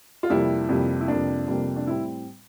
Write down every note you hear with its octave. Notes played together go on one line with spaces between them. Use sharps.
F4
F2 C3 G3 A#3 E4
F2 C3 G3 A#3
E4
F2 C3 G3 A#3 D4
F2 C3 G3 A#3
D4
A2 G3 C4 E4